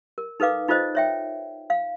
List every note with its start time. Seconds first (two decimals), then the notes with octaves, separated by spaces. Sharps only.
0.18 A#4
0.40 D#4 A4 B4 F5 D6
0.68 D#4 F4 A4 C5 D#5
0.95 C#5 E5 G5
1.70 F5